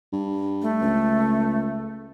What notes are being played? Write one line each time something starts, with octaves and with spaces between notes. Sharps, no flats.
G2
A3
C#2